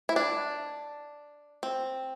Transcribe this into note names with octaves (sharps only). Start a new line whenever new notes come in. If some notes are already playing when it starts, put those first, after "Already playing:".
E4
D4
C4